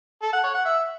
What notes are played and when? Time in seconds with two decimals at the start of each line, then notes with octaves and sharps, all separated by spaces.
0.22 A4
0.33 F#5
0.44 C#5
0.54 F#5
0.65 E5